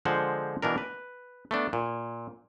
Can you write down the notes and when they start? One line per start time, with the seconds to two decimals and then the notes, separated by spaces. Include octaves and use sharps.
0.05 D3 F3 G#3 C5 F#5
0.62 B2 E3 D4 A#4
0.78 B4
1.51 A3 B3 D4
1.73 A#2